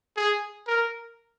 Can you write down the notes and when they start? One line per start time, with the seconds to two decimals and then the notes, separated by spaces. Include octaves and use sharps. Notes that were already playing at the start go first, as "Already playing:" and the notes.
0.17 G#4
0.67 A#4